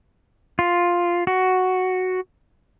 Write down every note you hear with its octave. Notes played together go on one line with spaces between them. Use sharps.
F4
F#4